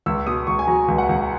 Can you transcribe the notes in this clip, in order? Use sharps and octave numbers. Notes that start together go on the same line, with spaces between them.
C#2 E6
B2 D#6
C#2 C#6
G#5
F#3 A#5
C#2
F#5
C#2